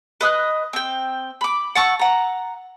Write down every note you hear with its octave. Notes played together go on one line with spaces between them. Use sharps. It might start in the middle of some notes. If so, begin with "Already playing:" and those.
B4 D#5 D#6 F#6
C4 G5
B5 D6
F#5 A5 C#6 E6
F#5 A#5